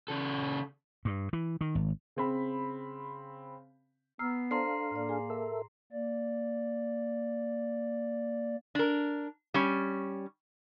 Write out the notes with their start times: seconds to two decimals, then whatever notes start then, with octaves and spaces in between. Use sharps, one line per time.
0.08 C#3 A4
1.05 G2
1.33 E3
1.61 D#3
1.75 G#1
2.16 C#3 C4 B5
4.19 B3 A#5 E6 F6 C7
4.51 D4 A4 C5 F5 A#5 C6 C7
4.91 A2 A#3 D5
5.09 G#4 G#5
5.30 A4 A#4 E5
5.92 A#3 D5
8.75 D4 A#4
9.54 G3 C#4